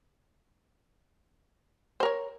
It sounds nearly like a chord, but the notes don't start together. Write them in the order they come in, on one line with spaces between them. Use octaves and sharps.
C5 A#4 C#5